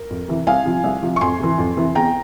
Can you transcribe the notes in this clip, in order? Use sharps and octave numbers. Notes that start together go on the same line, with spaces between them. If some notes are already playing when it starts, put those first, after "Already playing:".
Already playing: A#4
F2
C3 E3
C2 F5 G#5
C3 F3
C2
C3 F3
C#6
F2 G#5 C6
C3 E3
F2
C3 E3
E2 G5 A#5